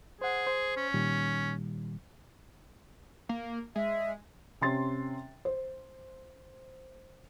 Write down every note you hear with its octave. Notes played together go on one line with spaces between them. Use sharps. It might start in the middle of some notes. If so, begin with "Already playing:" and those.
G#4 C5 F#5
C5
C#4
A#2 D#3 G3
A#3
G#3 E5
C3 C#4 C6 A6
C5